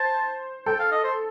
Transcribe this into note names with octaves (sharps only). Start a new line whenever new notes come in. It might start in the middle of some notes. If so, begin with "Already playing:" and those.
Already playing: C5 A5
A4 G5
F5
D#5
C5